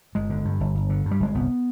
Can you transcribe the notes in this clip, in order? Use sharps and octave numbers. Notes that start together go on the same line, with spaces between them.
G1 G#3
D3
G2
G1
G1
D3
G2
G3
G1 G#3
C2 B3